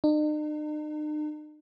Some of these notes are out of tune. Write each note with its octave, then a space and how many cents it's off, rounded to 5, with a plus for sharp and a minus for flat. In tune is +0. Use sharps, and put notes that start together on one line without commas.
D#4 -45